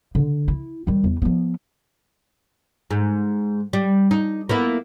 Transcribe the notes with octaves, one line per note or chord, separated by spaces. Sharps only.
D3
E4
D#3 G3
E2
F3 B3
G#2
G3
D#4
A#3 B3 E4